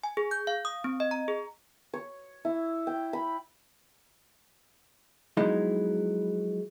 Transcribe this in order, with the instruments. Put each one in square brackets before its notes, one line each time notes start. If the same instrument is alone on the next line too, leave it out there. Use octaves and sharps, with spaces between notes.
[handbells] G#5
G#4
G6
F5
D#6
C4
D#5
A#5
G#4
[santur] C#5
E4
G5
B5
[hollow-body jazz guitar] F3 F#3 G#3 B3 D#4 E4